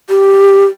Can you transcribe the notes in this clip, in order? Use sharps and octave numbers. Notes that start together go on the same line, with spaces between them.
G4